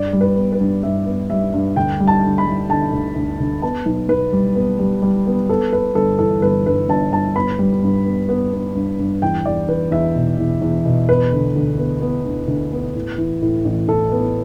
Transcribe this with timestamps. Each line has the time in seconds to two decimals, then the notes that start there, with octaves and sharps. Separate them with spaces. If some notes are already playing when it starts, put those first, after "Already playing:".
Already playing: G2 D5
0.13 G3
0.21 B4
0.36 B3
0.52 B4
0.60 G2
0.83 G2 E5
1.07 B3
1.30 G3 E5
1.53 G2
1.76 D2 G5
2.00 G3
2.07 A5
2.23 D3
2.38 B5
2.46 G3
2.69 D3 A5
2.92 D2
3.16 D2
3.40 D2
3.62 B3 A5
3.86 B1
4.09 B1 B4
4.33 G3
4.55 B3
4.79 G3
5.03 G3
5.26 B3
5.49 B3 A4
5.72 B3 B4
5.95 G1 A4
6.19 E3 A4
6.42 G1 B4
6.66 G2 B4
6.89 G1 A5
7.12 G1 A5
7.35 B3 B5
7.59 G3
7.83 G2
8.05 B3
8.29 B3
8.52 B3
8.75 G2
8.99 G2
9.22 E2 G5
9.45 E2 D5
9.68 E2 B4
9.91 E2 E5
10.15 B2
10.38 E2
10.62 E2
10.86 B2
11.09 B3 B4
11.32 D3
11.56 D2
11.78 B3
12.01 B3
12.25 D2
12.48 D2
12.72 B3
12.95 A2
13.18 E3
13.42 A2
13.65 A1
13.88 A2 A4
14.12 B3